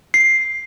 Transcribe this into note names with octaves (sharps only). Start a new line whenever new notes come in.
C7